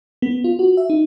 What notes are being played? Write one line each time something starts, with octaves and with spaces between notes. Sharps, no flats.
B3
F4
F#4
E5
D#4